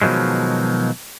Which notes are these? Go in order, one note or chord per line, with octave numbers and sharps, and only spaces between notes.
B2 D#3 F3 F#3 G#3